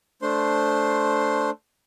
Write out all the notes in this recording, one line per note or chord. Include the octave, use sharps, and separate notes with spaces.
A3 D4 C5 C6